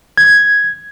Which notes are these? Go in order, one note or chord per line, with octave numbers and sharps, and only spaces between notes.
G#6